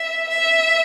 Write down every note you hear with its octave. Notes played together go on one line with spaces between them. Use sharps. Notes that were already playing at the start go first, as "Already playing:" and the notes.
Already playing: E5
E5